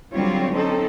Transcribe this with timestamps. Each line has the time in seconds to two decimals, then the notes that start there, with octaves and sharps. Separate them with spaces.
0.12 D3 F#3 G3 C4 F4 C#5
0.54 C4 C#4 D#4 A4